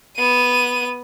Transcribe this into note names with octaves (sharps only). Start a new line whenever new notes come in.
B3 D#7